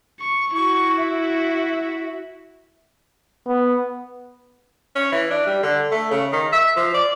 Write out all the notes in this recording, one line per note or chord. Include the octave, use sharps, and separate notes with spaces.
C#6
E4 F#4 C#6
E5
B3
C#4
E3
D4
G3
D3
A3
C#3
D#3
E5
F3
D5